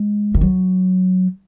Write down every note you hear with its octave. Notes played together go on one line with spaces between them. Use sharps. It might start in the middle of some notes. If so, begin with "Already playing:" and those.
Already playing: G#3
D#3
F#3